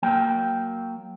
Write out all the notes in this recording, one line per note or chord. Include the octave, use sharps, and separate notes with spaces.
F#3 A#3 G5